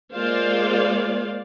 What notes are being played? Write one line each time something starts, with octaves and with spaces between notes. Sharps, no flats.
G#3 A#3 F4 C5 D5 F5